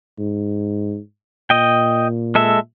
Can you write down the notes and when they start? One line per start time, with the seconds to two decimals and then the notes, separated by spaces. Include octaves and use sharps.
0.19 G#2
1.50 A#2 D#5 G5
2.35 G#3 A4 E5